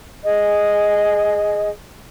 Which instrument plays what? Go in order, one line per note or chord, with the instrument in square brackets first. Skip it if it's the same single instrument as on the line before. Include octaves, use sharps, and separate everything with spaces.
[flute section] G#4 D#5